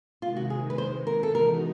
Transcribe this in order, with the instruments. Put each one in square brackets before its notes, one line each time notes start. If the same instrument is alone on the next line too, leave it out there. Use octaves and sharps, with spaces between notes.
[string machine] C3 D#3 G#3 [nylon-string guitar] F4
[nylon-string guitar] F#4
G#4
B4
C5
A#4
A4
[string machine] E3 G#3 B3 D#4 F#4 [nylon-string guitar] A#4